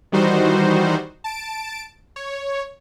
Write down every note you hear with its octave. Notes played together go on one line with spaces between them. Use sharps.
D#3 E3 G3 D#4 F#4 C5
A5 D7
C#5